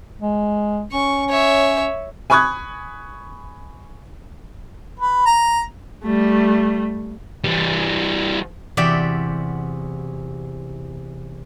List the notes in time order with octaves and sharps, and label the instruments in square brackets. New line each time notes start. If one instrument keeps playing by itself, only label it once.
[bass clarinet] G#3
[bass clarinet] C#4 [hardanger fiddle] C#6
[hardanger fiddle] C#5 E5
[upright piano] G#5 B5 C#6 D#6 F#6 G#6
[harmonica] B4
A#5
[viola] G3 A3
[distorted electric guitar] E3 G3
[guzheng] E2 C3 F#4 D5 E5 G5